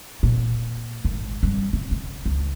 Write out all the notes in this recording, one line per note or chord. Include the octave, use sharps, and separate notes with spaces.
A#2
G#1
G2
C#3
C#3
C#2